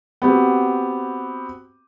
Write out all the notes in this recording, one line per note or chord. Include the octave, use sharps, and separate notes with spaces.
B3 C4 F#4 G4